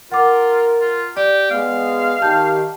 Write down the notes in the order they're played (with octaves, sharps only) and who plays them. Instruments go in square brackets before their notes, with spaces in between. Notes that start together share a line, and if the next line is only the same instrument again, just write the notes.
[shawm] F4 [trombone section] A#4 [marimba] F#5 D6
[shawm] F4
[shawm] G4 [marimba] D5
[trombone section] G#3 B3 [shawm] F5
[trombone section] D#3 G4 [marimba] A5 G6